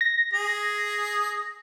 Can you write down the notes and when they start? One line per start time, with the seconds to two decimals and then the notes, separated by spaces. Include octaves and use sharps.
0.01 A#6
0.33 G#4